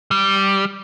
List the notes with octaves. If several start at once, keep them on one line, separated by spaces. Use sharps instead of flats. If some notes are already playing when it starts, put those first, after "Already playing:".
G3